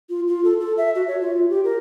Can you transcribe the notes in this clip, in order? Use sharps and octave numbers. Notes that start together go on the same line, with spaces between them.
F4
F4
A4
A4
E5
F#4
C#5
F4
G4
A#4